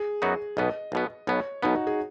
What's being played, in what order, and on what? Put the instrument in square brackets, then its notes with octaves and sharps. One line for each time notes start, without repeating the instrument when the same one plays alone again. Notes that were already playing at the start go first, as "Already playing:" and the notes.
Already playing: [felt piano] G#4
[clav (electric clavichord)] F#2 F#3 B3 D#4 F#4
[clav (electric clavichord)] B1 B2 B3 [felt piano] D#5
[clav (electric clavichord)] B1 B2 B3
[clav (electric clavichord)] B1 B2 B3 [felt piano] C#5
[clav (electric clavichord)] B1 B2 B3 [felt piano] D#4
[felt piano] F#4
G#4